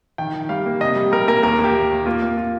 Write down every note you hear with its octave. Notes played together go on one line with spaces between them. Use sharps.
D#3 G5
D#3
G3 F5
A#3
C3 D#5
G3
G3 A#4
A#3 A#4
D#2 A#4
A#3 G4
D#2
D#2
A#3 F4
A#3
F4